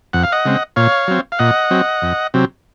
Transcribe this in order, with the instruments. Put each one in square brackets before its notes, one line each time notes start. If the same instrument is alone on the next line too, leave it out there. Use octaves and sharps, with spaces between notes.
[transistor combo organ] F2 F#5
F5
D#5 F#5
C#3 G#3 C4
A#2 C#5 F5
F#3 C4
F5
A#2 D#5 F#5
F#3 C4
F2
C3 F#3 C4